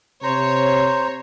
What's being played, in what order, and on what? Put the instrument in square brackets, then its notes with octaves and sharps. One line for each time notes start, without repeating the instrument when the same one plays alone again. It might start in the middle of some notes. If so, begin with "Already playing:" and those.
[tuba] C3 [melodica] C5 A#5 [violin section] C#5